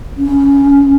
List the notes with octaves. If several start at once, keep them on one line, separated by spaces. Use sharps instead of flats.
C#4